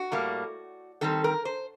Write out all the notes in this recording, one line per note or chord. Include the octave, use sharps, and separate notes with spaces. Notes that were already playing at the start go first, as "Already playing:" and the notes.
Already playing: F#4
A2 G3 A#3
D#3 G3 C4 A4
A#4
C5